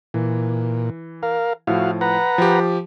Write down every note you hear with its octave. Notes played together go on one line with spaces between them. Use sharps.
A#2 E3
A#4 F5
A2 F3 E4 F#4 F5
B4 F#5 A#5
F3 G4